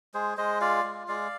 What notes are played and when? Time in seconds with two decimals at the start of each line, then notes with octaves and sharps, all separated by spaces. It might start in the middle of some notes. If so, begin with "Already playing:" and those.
0.14 G#3 G#4 C5
0.37 G#3 C5 D#5
0.61 F4 D5 F5
0.84 G#3
1.08 G#3 D5 F5